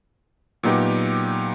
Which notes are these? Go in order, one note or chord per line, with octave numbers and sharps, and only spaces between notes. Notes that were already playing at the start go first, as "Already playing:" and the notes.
A#2 F#3 B3 D#4 G4